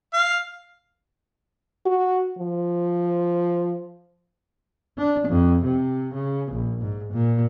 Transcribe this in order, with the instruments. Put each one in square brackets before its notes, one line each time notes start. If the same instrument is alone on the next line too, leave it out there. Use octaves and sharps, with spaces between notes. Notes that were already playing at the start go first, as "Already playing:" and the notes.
[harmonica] F5
[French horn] F#4
F3
[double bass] D4
F2
C3
C#3
A#1
G#2
A#2